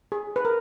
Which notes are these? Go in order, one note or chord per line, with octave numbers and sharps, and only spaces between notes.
G#4
B4
A#4